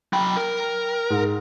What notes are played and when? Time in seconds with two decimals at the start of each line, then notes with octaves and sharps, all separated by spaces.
0.13 F#3 G5 B5
0.37 A#4
1.10 G#2